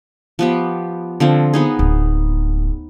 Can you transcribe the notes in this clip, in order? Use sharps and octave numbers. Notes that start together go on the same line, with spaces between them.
F3 B3 G4
D3 F3 C4
B3 D#4 G#4
D1